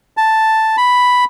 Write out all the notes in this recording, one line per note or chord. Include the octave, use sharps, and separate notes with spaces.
A5
B5